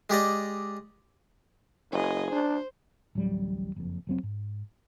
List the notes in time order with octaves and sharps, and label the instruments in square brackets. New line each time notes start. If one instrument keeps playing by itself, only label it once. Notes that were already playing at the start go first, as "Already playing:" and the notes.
[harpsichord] G#3 G4 D5 D#5
[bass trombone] F#1 [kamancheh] G#4 D#5
[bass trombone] D4 [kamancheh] C5
[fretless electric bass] D1 A1 F#3 G3
F#1 F2
F1 F#3 C4
G#2